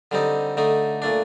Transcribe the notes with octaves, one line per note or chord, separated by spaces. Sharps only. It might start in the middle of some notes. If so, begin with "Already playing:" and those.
D3 G3 C4 D#4
D3 A3 D#4
A#2 A3 D4